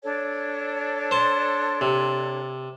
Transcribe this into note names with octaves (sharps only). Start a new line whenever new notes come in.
D4 A4 C#5
C5 A5
C3